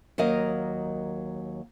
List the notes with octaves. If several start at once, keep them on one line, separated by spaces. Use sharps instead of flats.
D#2 F#3 A#4 D#5 F5